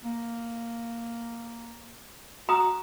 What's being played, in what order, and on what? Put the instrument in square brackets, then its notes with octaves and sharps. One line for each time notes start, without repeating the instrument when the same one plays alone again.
[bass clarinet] A#3
[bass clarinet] F#4 [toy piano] A#5 D#6